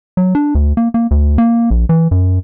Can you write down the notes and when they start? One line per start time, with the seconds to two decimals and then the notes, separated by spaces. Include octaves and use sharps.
0.17 F#3
0.35 D4
0.55 D2
0.77 A#3
0.94 A#3
1.11 D2
1.38 A#3
1.71 A#1
1.89 E3
2.11 F#2